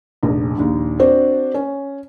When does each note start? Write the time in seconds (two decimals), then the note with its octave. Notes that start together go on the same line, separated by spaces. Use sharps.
0.23 F1 A#1
0.58 A#1 D#2
0.99 C4 D4 F#4 C5 D5
1.54 C#4